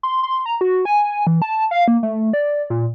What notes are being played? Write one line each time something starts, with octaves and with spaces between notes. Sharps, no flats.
C6
C6
A#5
F#4
G#5
E3
A5
F5
A#3
A3
D5
A#2